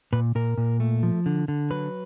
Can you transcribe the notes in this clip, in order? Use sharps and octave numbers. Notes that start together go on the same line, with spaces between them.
A#2 B4
A#2 A#4
A#2
A3
F3
D3
D3
F#3 B4